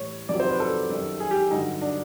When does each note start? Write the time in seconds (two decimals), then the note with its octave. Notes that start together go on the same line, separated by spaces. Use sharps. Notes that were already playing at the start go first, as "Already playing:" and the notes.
Already playing: A2 E3 G3 C#5
0.29 F2 C3 D#3 F#3 D5
0.40 C5
0.49 B4
0.60 A4
0.90 F#2 D#3 G3
1.20 G#4
1.31 G4
1.51 G2 D3 F#3 D#4
1.82 D4